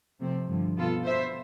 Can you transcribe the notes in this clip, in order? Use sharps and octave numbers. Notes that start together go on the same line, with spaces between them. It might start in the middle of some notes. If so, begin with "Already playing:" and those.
C3 F3 A3 C4
G2 D3 F3
B2 B3 F4 A4
B2 B3 C5 E5